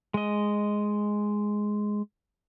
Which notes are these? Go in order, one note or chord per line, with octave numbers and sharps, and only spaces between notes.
G#3 D#5